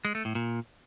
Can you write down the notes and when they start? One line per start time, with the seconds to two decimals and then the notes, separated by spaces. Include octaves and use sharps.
0.05 G#3
0.15 A3
0.25 A2
0.35 A#2